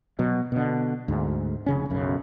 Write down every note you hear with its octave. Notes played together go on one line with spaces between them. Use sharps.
B2 F#3
B2 D3
D2 G#2
F1 C#3 C#4
B1 F#2 C#3